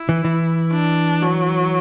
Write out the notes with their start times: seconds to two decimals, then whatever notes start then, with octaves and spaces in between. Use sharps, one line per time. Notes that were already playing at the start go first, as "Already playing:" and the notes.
Already playing: E4
0.09 E3
0.24 E3
0.73 D4
1.22 F#3